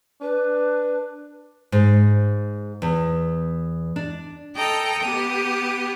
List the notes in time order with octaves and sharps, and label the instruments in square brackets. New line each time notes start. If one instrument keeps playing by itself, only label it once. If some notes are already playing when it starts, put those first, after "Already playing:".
[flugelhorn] D4 [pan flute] B4
[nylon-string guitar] G#2
E2
D4
[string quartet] A4 D#5 G5 A#5
B3 G4 D#6